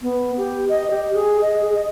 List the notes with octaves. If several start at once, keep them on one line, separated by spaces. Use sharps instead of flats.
B3
G4
D#5
G4
G#4
D#5
G#4
D#5